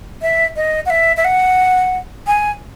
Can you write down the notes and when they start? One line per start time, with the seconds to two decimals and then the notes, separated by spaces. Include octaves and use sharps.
0.22 E5
0.56 D#5
0.86 F#5
0.90 E5
1.17 E5
1.25 F#5
2.27 G#5